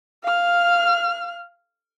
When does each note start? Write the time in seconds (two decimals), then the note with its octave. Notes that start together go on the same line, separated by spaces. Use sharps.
0.24 F5 F6